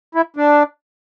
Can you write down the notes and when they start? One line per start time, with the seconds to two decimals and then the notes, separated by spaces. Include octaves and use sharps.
0.15 E4
0.37 D4